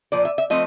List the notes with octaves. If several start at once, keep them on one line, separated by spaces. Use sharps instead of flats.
A#2 F3 D5
E5
E5
F3 A3 C4 D#5